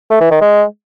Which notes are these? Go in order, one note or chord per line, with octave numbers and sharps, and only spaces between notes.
A3
E3
D#3
G#3